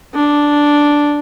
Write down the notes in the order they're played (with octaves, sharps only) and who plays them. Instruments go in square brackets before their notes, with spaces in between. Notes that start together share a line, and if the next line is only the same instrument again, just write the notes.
[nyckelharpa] D4